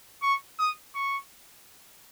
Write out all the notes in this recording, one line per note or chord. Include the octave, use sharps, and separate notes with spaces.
C#6
D#6
C#6